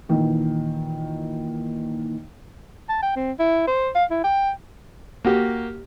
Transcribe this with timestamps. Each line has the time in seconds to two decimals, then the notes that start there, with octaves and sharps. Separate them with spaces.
0.09 A#2 D#3 E3
2.89 A5
3.02 G5
3.16 C4
3.39 E4
3.67 C5
3.95 F5
4.10 E4
4.24 G5
5.25 A#3 F#4 G4